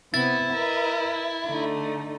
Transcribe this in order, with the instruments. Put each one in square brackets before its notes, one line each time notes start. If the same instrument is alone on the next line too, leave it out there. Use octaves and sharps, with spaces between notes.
[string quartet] C3 B3 [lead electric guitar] E4 [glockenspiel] A6
[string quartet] A#4 B4 D#5
D3 A3 D#4